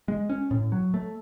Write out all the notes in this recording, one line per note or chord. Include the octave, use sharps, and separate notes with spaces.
G#3
C#4
A2
F#3
A3